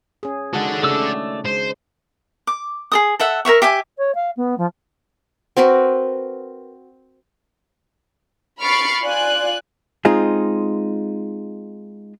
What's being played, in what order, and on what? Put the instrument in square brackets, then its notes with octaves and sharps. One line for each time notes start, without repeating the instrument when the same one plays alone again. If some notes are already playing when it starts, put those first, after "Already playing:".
[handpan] C#4 G#4
[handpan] D#3 G#3 F#4 [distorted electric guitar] A4 F#5
[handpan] C#3 D4 [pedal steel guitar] A3 D5 E6
[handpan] G#3 [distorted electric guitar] C5
[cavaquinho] D6
G#4 A4 D#6
A4 E5 F#5
A#4 C#5 E5 C#6
G4 E5 G#5 D6
[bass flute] C#5
F5
B3
F3
[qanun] C4 F#4 A#4 B4
[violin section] B5 C#6 F6 A6 C7 D7
F4 D5 G#5 F#6
[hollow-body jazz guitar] G#3 C4 D#4 F4 G#4